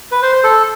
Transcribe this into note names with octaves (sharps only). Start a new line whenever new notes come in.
B4
C5
C5
A4